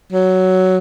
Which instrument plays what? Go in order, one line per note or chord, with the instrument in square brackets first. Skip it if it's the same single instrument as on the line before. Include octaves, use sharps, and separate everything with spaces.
[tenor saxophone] F#3